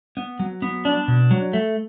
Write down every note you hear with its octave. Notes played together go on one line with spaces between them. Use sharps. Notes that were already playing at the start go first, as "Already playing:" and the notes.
B3
F#3
B3
D4
B2
F#3
A3